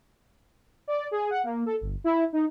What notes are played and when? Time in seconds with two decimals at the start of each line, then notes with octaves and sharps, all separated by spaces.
0.88 D5
1.11 G#4
1.30 F#5
1.44 A#3
1.66 A4
1.81 G1
2.04 E4
2.33 D#4